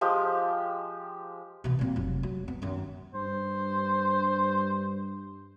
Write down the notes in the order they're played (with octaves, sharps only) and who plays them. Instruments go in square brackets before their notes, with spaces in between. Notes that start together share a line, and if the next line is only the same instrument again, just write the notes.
[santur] F3 G#3 G4
[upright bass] B2 E3
A#2 C4
F1 F#3
F#3
B3
F#2 D#3
[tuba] G2 [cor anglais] C5